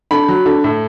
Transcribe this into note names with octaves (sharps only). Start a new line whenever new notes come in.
D3 B5
F#3
D3
A2